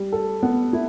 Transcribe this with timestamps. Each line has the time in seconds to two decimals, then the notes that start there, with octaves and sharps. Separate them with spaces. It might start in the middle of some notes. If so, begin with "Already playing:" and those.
Already playing: G3
0.12 A4
0.43 B3
0.73 E4